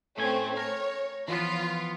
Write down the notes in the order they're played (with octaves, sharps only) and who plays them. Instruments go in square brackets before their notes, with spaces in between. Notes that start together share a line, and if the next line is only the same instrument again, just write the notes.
[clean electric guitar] A2 C#4 G#5 [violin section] A3 C4
[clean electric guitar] A#4 [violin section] C#5
[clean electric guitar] E3 F3 B3 [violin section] F4